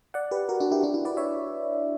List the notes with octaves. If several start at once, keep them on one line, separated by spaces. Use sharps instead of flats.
D5 F#5
G4 B4
F#4 A#4
D4 F#4
E4 G4
D4 F#4
E4
B4 D5
C#5 E5